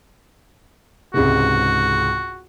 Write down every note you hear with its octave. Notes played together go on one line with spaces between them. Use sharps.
C#2 G#2 C3 F#4